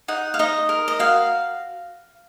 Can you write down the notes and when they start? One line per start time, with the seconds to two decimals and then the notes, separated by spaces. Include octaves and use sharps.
0.08 D#4 F#5
0.34 F5
0.39 D#4 D#5
0.69 A#4
0.88 D#5
0.99 F#4 F5